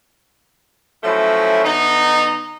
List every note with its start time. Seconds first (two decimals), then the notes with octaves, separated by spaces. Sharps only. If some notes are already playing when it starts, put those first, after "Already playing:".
1.03 F3 F#3 A3 C#4 E4
1.64 D3 B3 D#4